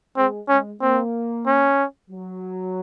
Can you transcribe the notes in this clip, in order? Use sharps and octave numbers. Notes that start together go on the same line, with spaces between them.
G#3 C4
G#3 C#4
A#3 C4
C#4
F#3